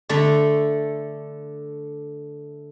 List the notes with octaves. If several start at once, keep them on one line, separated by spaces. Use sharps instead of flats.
D3 A3 A4